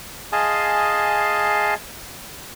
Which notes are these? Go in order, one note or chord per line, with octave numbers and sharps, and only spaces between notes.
G#4 D#5 F5 G#5 A5 C6